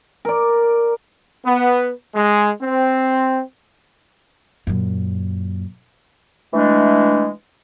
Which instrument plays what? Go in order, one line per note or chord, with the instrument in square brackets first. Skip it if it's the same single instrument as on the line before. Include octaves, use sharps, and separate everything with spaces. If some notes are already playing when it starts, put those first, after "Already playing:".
[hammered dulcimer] A#4 D5
[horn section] B3
G#3
C4
[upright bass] F#2 A#2
[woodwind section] E3 G#3 A3 D4